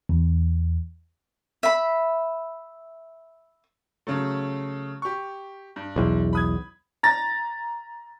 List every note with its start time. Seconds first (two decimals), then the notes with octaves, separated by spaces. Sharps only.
0.09 E2
1.63 E5 B5
4.07 C#3 F#3 A3
5.02 G4 C#6
5.76 G2
5.96 B1 E2
6.33 B5 D#6 G#6
7.03 A#5 A6 A#6